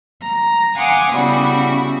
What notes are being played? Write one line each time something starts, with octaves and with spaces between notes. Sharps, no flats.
A#5
F5 F#5 G#5 C6 D6 D#6
C#3 G3 B3 E4 F#4